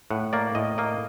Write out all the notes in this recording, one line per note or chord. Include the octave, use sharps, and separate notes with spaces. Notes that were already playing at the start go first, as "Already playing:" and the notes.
A2 F#5
A#3 D5
A2 D#5
A#3 D#5